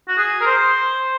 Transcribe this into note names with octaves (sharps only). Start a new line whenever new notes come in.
F#4
G#4
A#4
C5